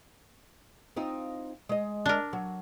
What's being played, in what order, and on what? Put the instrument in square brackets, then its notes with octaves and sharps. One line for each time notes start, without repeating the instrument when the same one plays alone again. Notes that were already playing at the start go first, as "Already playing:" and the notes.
[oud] C4 D#4 F4
G#3 D#5
[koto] D4 A#4
[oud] F#3